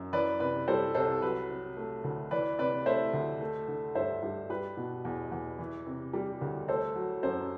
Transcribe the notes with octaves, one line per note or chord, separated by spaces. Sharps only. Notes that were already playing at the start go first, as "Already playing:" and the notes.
Already playing: F#2
E3 B4 D5
C3 B4
G3 A4 C5
C2 A4 C5
F#3 B4
C3
A3
D2
E3 B4 D5
C3 B4 D5
A3 C5 E5
D2
A3
D3
G2 C5 E5
G2
G3 B4
B2
E2
E2
E3
C3
G3
D2
A3 A4 C5
F#3
F#2 A4 C5